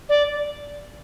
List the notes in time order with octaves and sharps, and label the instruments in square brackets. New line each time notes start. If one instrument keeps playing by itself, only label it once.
[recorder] D5